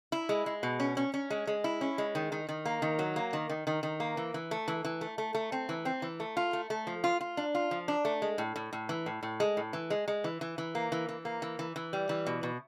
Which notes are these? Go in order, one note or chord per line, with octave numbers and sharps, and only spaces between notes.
E4
G#3
G#3
B2
C#4
C#4
C#4
G#3
G#3
E4
C#4
G#3
D#3
D#3
D#3
A#3
D#3
F#3
A#3
D#3
D#3
D#3
D#3
A#3
E3
E3
A3
E3
E3
A3
A3
A3
C4
E3
C4
E3
A3
F4
A3
A3
F3
F4
F4
D4
F4
F3
D4
A3
G#3
A2
A2
A2
E3
A2
A2
G#3
A2
E3
G#3
G#3
E3
E3
E3
A#3
E3
E3
A#3
E3
E3
E3
G3
E3
B2
B2